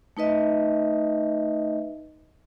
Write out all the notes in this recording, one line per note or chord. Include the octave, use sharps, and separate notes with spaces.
A3 D#4 B4 D#5 E5